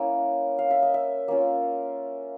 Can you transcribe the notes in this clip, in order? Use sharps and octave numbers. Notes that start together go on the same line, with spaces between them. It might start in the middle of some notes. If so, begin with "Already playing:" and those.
Already playing: A#3 C#4 E4 A#4
F5
E5
D#5
E5
A#3 C#4 F4